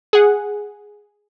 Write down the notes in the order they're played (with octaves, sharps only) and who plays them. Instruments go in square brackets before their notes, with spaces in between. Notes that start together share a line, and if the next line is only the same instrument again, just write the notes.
[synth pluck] G#4 F#5